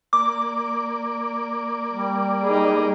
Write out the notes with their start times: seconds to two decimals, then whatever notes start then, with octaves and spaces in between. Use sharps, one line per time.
0.13 A#3 D5 D6
1.90 G3
2.43 D#4 G#4